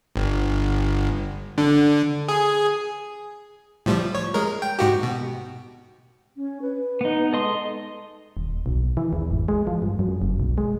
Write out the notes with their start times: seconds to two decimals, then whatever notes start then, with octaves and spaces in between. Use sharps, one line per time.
0.16 G1
1.58 D3
2.29 G#4
3.86 A2 F3 G3
4.15 C#5
4.34 G#3 A#4
4.62 G5
4.79 G#2 F#4 G4
5.03 B2
6.35 C#4
6.62 B4
7.01 B3 D#4
7.33 G#3 A4 D#5 C6
8.37 D#1
8.66 B1
8.97 E3
9.13 E2
9.31 G#1
9.48 G#3
9.67 F3
9.82 G2
9.99 F#2
10.22 F#1
10.40 B1
10.58 G#3